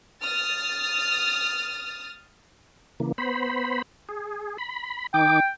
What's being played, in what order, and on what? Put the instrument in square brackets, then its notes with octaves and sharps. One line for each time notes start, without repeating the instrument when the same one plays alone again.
[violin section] D#6 F6 A6
[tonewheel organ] C#3 E3 A#3
B3 C5 B5
G#4
B5
[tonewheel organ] D#3 D#4 D6 [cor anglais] G5